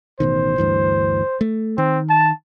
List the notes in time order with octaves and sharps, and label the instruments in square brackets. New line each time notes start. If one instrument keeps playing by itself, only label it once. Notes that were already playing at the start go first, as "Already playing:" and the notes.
[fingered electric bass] A1 B2 D#3 [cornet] C5
[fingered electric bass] D2 G2 E3
A3
[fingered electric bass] D#3 [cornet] C4
[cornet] A5